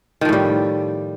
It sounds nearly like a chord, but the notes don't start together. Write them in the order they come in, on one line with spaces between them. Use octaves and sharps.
D#3 F3 A2 G3